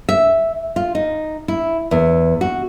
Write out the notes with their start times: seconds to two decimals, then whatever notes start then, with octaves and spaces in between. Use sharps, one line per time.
0.09 E5
0.76 F4
0.95 D#4
1.48 E4
1.91 E2
2.41 F#4